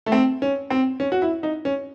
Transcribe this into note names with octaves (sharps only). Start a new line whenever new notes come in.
A3
C4
C#4
C4
C#4
F#4
E4
D#4
C#4